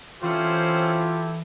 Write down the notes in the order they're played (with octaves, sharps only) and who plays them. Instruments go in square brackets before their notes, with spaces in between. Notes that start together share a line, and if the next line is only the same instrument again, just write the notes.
[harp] E3 [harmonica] C4 C#4 C5 [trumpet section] E4 G4 A4 [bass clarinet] F4